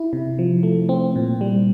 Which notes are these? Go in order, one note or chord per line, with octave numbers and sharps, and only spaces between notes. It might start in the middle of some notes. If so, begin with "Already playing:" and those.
Already playing: E4
C3
F3
A3
C4
A#2
G3